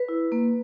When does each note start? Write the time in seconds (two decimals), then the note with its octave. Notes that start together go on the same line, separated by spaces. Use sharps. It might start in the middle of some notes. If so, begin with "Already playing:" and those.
Already playing: B4
0.09 E4
0.32 A#3